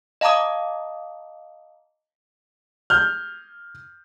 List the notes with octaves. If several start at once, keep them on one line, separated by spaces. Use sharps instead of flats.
D#5 F5 A5 A#5 D6 D#6
F6 G6